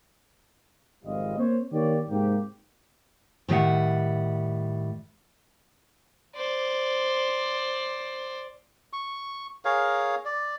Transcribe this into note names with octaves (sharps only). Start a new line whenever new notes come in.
G#1 F2 G3 F4 D#5
A#3 C4 C5 C#5
D#3 A#3 G4 C#5 D5
G#2 C3 A#3 G4
A2 D#3 G3 D#5 E5 F#5
C5 D5
C#6
G#4 A#4 C#5 F5
D5